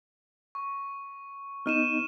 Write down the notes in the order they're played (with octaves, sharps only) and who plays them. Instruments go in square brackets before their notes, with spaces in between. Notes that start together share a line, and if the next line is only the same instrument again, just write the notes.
[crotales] C#6
[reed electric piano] B3 D#4 [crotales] F6 D#7 E7